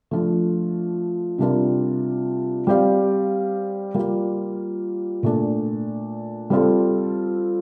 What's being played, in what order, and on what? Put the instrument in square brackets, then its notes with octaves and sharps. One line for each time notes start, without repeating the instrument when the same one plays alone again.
[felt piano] F3 A3 D4 F4
C3 G3 D4 F4 A#4
G3 C4 G4 D5 F5
G3 A#3 F4
A#2 A3 D4
G3 C4 F4 A4